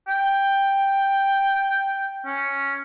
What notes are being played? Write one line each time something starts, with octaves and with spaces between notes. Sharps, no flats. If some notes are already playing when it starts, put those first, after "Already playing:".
G5
C#4